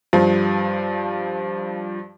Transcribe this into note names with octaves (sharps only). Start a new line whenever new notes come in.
G2 F3